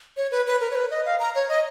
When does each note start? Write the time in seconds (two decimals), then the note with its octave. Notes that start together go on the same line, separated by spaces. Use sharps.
0.17 C#5
0.31 B4
0.46 B4
0.61 A#4
0.71 C#5
0.75 B4
0.91 D#5
1.06 F5
1.19 A#5
1.35 C#5
1.49 D#5